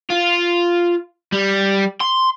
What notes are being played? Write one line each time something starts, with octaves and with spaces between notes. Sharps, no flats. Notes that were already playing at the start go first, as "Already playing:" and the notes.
F4
G3
C6